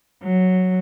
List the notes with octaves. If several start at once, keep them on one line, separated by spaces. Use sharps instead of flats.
F#3